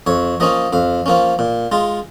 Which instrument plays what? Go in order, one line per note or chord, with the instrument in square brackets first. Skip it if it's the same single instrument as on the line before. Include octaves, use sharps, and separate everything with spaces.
[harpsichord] F2 C#5
F3 A#3 C#4 D#5
F2 F5
F3 A#3 C#4
A#2
G#3 F4